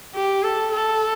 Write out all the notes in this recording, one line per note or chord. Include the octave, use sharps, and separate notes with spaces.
G4
A4
A4